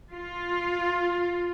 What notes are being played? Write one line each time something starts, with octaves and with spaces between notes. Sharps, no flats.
F4